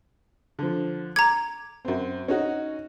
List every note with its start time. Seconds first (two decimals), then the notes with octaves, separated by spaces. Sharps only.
0.59 D3 F3
1.16 A#5 D6 G#6
1.85 F#2 C4
2.28 C#4 D#4 F#4